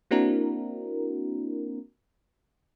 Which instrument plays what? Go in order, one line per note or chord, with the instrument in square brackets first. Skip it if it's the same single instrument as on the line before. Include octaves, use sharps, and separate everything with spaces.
[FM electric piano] A#3 C4 D4 E4 F#4 A#4